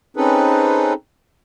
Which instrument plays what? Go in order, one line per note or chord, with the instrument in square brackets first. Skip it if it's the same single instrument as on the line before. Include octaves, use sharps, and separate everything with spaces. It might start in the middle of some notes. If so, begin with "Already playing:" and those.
[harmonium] C4 C#4 D#4 G#4 A4 B4